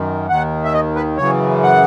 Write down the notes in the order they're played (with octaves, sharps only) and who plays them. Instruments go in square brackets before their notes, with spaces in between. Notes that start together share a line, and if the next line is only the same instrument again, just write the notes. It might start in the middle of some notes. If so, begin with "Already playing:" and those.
Already playing: [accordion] F#2 D#3
D#2 D#3 F#5
E5
D#5
B4
F#2 C#3 E3 C#5
F#5